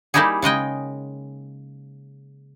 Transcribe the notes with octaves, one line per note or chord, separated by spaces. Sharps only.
G3 A#3 D#4 E4 G4 G#4
C#3 G#3 D#5 G5